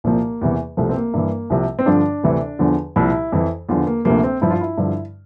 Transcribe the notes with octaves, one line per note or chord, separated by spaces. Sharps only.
C2 A#2 F3 A#3
E2 C3 E3
C2 C3 F3 A3
C4
A#3
G2 E3
C2 C3 F3
C4
G2 D3 F3 D4
D2 C3 E3
E2 D3 F3
C2 A#2 F3 E4
F2 E3
E2 D3 F3 F4
A#3
D2 C3 F3 A#3
C4
G2 F3 E4
F4
E4
G2 D3 F3